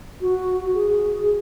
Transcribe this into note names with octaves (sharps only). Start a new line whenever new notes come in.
F#4
G#4